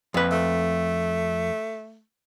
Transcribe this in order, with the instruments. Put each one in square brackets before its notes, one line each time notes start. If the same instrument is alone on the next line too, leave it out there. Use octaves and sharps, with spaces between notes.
[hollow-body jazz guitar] F2 B4
[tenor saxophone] A3